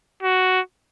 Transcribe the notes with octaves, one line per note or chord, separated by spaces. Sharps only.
F#4